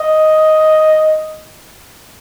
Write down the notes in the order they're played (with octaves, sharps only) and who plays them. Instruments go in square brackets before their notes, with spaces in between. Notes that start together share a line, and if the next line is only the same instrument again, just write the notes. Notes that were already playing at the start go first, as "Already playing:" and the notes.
Already playing: [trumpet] D#5